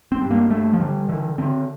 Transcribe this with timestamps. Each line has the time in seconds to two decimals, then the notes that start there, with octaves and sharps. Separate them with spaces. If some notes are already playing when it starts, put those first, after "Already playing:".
0.12 C4
0.21 G2
0.30 A#3
0.51 G2 A3
0.73 F3
0.80 D3 G3
1.09 D3 E3
1.38 D3 C4